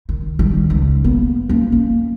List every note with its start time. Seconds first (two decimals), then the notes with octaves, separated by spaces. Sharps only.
0.09 D#3
0.39 D#3 G3
0.70 C#2 D#3
1.04 A#3 B3
1.49 A#3 C#4
1.72 A#3